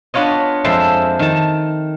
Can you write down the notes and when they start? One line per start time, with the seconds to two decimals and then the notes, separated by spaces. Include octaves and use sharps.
0.14 B3 D4 F4 C#5 D#5
0.64 F2 G#3 A4 C5 E5
1.19 D#3 A5